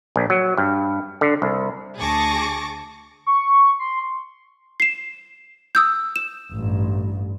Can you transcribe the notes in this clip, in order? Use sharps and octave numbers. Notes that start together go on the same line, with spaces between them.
A#1
F#3
G2
D3
C2
D2 G#4 A5 C#6 D6 A#6
C#6
C6
C7 E7
D#6 E6 G6
E7
A1 G2